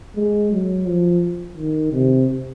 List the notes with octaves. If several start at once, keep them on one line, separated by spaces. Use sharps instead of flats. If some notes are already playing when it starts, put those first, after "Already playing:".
G#3
F#3
F3
D#3
C3